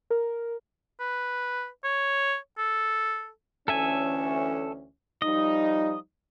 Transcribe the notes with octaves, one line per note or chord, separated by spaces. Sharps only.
A#4
B4
C#5
A4
D2 E3 C#4 A4 E5 G#5
F3 G3 D#4 D#5